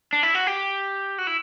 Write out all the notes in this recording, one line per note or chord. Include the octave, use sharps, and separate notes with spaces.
D4
E4
F#4
G4
F#4
E4